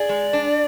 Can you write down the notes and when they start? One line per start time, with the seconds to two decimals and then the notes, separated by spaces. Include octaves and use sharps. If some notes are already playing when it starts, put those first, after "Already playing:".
Already playing: G#4 D5
0.09 G#3
0.33 D4